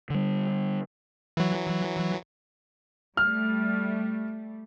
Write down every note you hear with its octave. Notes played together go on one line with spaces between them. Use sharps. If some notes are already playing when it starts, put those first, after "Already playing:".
D3 G3
E3 F#3
G3 A3 F6